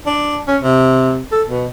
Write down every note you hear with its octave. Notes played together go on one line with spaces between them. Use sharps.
D4
C#4
C3
A4
B2